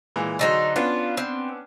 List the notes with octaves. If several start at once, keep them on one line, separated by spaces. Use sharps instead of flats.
A#2 E3 G#3
D3 F#3 D#4 G#4 C5
B3 C#4 D4 F4
C4